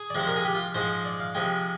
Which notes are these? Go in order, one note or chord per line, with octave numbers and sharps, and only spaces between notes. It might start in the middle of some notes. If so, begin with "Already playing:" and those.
Already playing: G#4
D5
C3 F3 G#3 C5
A#4
G#4
G4
F4
G#2 F3 G#3 C5
D5
F5
C3 F3 G#3 G5